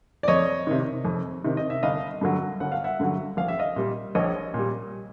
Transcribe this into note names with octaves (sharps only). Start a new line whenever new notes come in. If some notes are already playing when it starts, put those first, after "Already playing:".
D5
F2 C#5 D#5
C3 D#3
F2
C3 D#3
D#5
E5
G1 D#5 F5
G2 D3 F#3
G1 F#5
F5
E5 F#5
G2 D3 F#3
A#1 F5
E5
D#5 F5
A#2 G3
A#1 C#5 D#5
A#2
G3